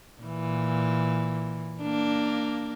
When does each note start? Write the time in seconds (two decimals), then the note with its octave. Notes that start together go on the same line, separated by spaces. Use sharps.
0.22 A#2 E3
1.81 A#3 D4